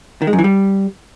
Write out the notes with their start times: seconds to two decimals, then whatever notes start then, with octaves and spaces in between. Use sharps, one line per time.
0.22 D#3
0.27 G#3
0.33 F#2
0.39 E3
0.44 G3